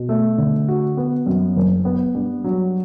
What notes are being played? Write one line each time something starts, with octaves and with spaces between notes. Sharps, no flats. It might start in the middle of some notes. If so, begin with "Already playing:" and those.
Already playing: B2
A3
D3
F#4
B3
F#2
F#1
B3
G2
F#3